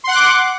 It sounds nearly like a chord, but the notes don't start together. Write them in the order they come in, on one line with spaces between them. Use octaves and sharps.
C6 F#5 F#6 D6